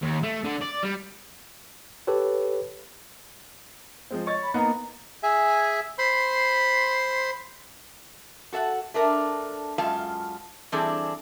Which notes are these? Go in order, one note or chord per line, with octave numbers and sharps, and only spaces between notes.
D#2
A3
D3
D5
G3
G4 A4 B4 C#5
F3 G#3 C4
C#5 D#5 C#6 A6
B5
A#3 B3 D#4 A#5
G#4 E5 G#5
C5 B5 C6
F#4 A4 F5 F#5
A3 D4 A#4
F#2 G#3 F4 F5 A5
E3 G3 C4 D4 G#4 A4